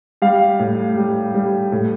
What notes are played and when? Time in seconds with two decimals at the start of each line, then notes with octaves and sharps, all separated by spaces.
0.22 G3 F5
0.59 A2
0.97 G3
1.34 G3
1.72 A2